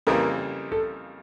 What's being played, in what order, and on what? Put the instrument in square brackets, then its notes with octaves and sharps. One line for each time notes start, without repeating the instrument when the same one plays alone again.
[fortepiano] F2 C#3 E3 G3 A#3 [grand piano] A#4
[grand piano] A4